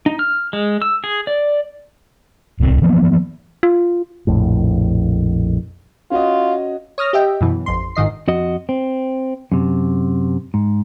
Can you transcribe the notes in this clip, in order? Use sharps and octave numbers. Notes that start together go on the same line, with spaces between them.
D#4
F6
G#3
E6
G#4
D5
D1 C2 C3 C4
E3 F3 A#3 B3
F4
A#1 F2 A2
C#4 F4 F#4 D#5
C#5 D#6 F6 A#6
G4 D#5 E5 G5
F#2 B2 E3
A1 F2 C6
G1 G#2 D#3 D#5 C7
F2 F#4 D#5
C4
F#2 C3
G#2